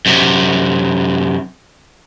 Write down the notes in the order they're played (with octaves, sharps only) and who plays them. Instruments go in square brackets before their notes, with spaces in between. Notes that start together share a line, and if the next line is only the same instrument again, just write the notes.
[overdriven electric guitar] F#2 C3